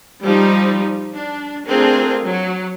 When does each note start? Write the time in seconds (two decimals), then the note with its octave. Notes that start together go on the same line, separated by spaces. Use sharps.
0.24 F3 G3 D#4
1.16 D4
1.67 A3 C4 D4 F4 G#4 A#4
2.20 F#3